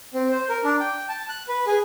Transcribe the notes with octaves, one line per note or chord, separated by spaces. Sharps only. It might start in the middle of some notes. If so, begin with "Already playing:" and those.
C4
C5
A#4
D4
G5
A5
F#6
B4
G#4